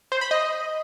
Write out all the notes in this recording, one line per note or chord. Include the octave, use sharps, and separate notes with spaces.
C5
B5
D#5